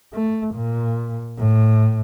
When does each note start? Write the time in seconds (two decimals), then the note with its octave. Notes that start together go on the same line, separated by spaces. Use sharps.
0.13 A3
0.55 A#2
1.38 A2